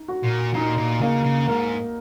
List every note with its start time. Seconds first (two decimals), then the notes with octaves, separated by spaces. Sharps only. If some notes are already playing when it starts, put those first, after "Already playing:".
Already playing: D#4
0.08 F#4
0.24 A#2
0.54 A#2 D#4
0.78 A#2
1.01 C#3 A#3
1.24 C#3
1.47 G#2 A#4